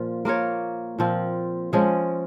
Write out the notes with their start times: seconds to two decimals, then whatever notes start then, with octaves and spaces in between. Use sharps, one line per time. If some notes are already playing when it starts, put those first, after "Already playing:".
Already playing: A#2 F3 F4
0.25 A#3 F4 A#4 C#5
0.98 A#2 F3 C4 F4
1.73 F3 G#3 C#4 G#4